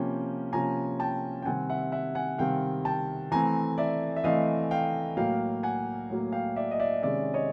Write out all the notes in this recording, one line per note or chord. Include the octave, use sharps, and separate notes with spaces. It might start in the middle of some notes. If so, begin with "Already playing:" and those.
Already playing: C3 F3 A#3 C#4 G5
C3 F3 A#3 C#4 G#5 A#5
G5 A5
G5
C3 D#3 G3 C4 F#5 G#5
E5 F#5
E5 F#5
F#5 G#5
C3 D#3 G3 C4 F5 G5
G5 A5
E3 A3 C4 G#5 A#5
D5 E5
E5
E3 A3 C4 D#5 F5
F5 G5
A2 F#3 A#3 F5 G5
F#5 G#5
A2 F#3 A#3
F5 G5
D5 E5
D#5
D5 E5
C3 D#3 G#3 C#4 D5 E5
C#5 D#5